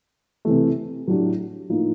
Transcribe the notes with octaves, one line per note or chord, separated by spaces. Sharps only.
C3 E3 A3
A2 F#3 A3 D4 G4
A2 F3 A#3 D#4